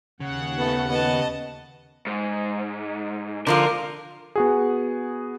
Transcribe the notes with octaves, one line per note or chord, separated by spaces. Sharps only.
D#2 C#3 F#5
A3 B3 A4
B3 D#5 A5
G#2
D3 F3 F4 A#4
B3 F#4 G#4